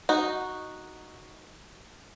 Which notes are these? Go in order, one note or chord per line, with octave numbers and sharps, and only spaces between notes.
D#4 F#4